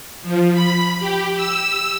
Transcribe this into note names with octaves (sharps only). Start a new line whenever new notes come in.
F3
B5
G4
E6